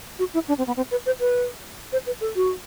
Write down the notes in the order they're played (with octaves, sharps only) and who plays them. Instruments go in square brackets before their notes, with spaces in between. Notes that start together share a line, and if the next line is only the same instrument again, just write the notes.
[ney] F#4
E4
D4
C4
B3
C4
B4
C5
B4
C5
B4
A4
F#4